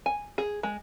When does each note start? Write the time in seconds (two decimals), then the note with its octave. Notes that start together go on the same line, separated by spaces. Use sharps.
0.06 G#5
0.38 G#4
0.63 G#3